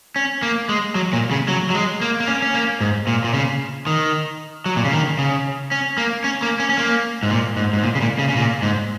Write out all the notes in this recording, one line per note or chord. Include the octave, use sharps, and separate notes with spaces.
C#4
A#3
G#3
F#3
A#2
C#3
F#3
F#3
G#3
A#3
A#3
C#4
C#4
A#3
G#2
A#2
A#2
C#3
D#3
F#3
A#2
C#3
D#3
C#3
C#4
A#3
C#4
A#3
C#4
C#4
A#3
G#2
A#2
G#2
G#2
A#2
C#3
A#2
C#3
C#3
A#2
G#2